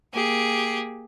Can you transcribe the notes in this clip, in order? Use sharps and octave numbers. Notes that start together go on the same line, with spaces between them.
A#3 G4 G#4